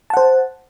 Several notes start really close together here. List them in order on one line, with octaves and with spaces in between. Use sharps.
A5 F#5 C5